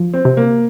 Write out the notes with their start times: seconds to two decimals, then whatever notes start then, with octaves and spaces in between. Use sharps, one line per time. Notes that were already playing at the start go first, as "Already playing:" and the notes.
Already playing: F3
0.13 C4
0.25 C3
0.37 A#3